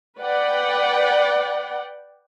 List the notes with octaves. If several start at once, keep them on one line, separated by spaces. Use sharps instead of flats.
B4 D5 F#5 G5